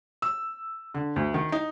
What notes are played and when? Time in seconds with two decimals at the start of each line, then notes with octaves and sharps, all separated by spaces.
0.22 E6
0.94 D3
1.16 D2
1.34 D#3
1.52 D#4